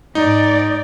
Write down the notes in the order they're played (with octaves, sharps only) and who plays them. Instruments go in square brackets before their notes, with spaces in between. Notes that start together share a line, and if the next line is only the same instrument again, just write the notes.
[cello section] G#2 D5 [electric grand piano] D#4